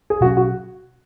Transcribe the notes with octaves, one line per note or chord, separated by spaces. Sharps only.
G#4
B2 F#3 C#4 F#4
F#4